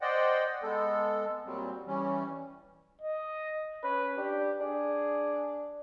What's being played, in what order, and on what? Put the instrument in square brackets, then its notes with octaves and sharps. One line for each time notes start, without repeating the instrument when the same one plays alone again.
[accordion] C5 D5 D#5 F#5 G5
G#3 B3 A4
A#2 F#3 G3 C4
E3 G3 C#4
[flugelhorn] D#5
[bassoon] C#4 [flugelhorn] B4
[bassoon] D4 [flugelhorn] G4
[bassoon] D4 [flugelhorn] G#4